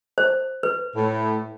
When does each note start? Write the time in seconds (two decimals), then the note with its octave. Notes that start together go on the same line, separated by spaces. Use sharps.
0.18 C5
0.63 B4
0.95 A2